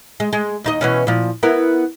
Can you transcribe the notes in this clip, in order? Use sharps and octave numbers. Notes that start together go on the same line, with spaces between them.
G#3
G#3
D#2 D#4 D#5
B2 E3 C#4
A#2 F3
B3 E4 A#4